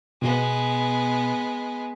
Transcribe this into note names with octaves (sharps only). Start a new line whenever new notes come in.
B2 G#3 B3